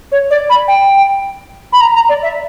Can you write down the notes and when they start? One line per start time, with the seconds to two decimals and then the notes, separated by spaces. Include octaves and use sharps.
0.12 C#5
0.30 D5
0.49 B5
0.68 G5
1.72 B5
1.81 A#5
1.95 A#5
2.09 D5
2.23 E5